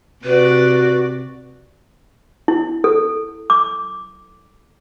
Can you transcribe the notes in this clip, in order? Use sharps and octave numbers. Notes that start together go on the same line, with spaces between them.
C3 F#4 B4 D5
E4
A4
D6